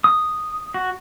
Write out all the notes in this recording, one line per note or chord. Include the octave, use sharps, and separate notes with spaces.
D#6
F#4